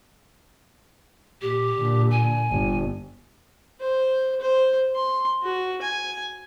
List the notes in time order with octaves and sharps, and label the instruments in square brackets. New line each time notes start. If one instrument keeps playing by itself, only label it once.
[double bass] A#2 [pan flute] G4
[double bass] A#2 D3
[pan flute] G#5
[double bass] G1
[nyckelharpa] C5
C5
C6
F#4
G#5